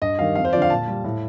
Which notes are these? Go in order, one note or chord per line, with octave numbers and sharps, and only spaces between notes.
G2 D#5
D#3 G3 F5
F2 F5
C5
D3 F3 D5 F5
A#2 A5
G3
A2